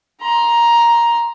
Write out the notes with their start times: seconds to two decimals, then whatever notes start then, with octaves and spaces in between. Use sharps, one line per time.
0.21 A#5 C6